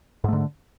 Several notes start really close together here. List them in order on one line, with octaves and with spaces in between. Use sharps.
G#2 A3 D3